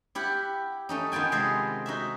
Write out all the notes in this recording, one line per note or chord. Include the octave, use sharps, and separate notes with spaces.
E4 G4 F#5
A3 C#4 D#4
D#3 B3 F4 G5 G#5
C3 G#3 G#4 A4 C5
D#4 F#4 E5